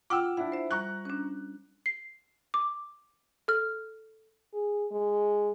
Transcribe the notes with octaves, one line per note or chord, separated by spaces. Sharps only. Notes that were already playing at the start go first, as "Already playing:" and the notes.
F4 F#5 G5 D6 E6 F6
D4 E4 F#5
C5 E5
G3 A#5 C#6 F#6
C#4 D4
C7
D6
A4 F6
G#4
G#3